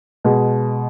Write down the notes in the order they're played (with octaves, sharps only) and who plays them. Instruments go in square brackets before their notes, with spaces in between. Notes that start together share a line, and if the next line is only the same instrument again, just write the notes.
[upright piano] B2 G#3